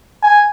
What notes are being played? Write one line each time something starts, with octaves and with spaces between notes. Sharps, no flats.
G#5